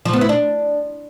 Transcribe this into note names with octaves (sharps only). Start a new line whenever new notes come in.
F3
B3
E4
D4